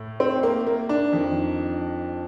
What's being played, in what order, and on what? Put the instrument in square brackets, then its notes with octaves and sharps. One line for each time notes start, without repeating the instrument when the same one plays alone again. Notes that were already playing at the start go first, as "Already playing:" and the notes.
Already playing: [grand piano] A2
C4
A#3
A#3
D4
F2 D#3